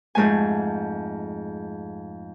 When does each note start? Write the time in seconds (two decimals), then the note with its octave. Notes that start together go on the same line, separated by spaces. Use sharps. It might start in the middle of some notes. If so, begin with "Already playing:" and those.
0.15 F2 G#2 A3 G#5